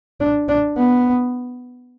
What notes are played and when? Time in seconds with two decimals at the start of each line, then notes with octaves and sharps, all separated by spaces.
0.20 D4
0.49 D4
0.77 B3